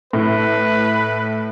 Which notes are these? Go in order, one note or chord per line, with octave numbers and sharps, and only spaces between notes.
A2 B4